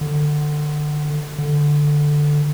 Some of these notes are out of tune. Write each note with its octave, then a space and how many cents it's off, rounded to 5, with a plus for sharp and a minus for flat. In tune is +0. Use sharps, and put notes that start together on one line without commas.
D3 +25
D3 +5